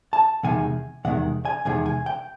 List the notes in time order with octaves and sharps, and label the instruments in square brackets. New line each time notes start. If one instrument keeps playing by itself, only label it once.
[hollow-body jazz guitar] A5
E2 C3 D#3 G#3 G#5
E2 C3 D#3 G#3 F#5
G#5
E2 C3 D#3 G#3 G#5
G#5
G5